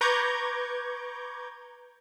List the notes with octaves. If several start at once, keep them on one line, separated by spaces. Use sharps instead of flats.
B4 A#5 C#6 D6 G6 G#6